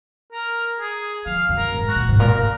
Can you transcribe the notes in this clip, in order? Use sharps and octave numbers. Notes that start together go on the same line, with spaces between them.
A#4
G#4
F3 F5
F#2
A#4
G#2
F#4
A#2
G#2
A#2 A#4